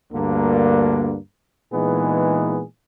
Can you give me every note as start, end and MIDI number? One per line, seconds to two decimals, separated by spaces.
0.13 1.15 38
0.13 1.15 43
0.13 1.15 50
0.13 1.15 58
1.73 2.62 46
1.73 2.62 52
1.73 2.62 56
1.73 2.62 59
1.73 2.62 63
1.73 2.62 68